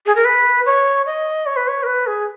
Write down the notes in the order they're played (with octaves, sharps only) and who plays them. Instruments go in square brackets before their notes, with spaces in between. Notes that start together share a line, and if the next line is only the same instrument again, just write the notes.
[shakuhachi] G#4
A#4
B4
C#5
D#5
C#5
B4
C#5
A#4
B4
G#4